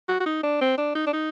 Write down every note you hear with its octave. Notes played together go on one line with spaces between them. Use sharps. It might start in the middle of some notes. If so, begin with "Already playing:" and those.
F#4
F#4
D#4
D4
C4
D4
D#4
D4
D#4